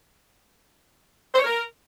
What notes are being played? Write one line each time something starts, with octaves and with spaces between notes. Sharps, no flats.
C5
C#5
A#4